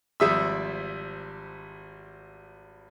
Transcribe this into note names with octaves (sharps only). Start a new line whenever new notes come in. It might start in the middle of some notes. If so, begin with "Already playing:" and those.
G#1 F3 G3 E5 D#6 E6